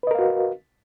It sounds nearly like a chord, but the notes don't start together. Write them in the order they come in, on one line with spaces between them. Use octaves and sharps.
B4 D#5 A#4 F5 F#4